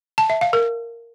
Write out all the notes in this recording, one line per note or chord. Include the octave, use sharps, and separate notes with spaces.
A5
E5
F5
A#4